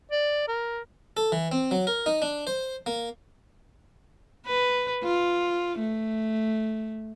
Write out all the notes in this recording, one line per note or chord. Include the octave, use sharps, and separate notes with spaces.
D5
A#4
A4
E3
C4
F#3
A#4
D#4
D4
C5
A#3
B4
F4
A3